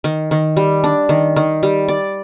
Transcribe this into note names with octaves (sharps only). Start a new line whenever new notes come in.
D#3
D#3
G3
D4
D#3
D#3
G3
D5